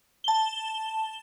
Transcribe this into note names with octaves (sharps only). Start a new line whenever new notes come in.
A5 G7